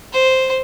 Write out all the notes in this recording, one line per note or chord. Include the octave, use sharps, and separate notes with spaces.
C5